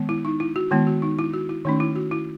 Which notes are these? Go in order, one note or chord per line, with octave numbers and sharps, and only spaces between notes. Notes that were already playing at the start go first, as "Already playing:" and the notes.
Already playing: D#3 G#3 B3
E4
D#4
E4
F#4
D#3 G#3 B3 E4
F#4
D#4
E4
F#4
E4
D#3 A3 C#4 D#4
E4
F#4
E4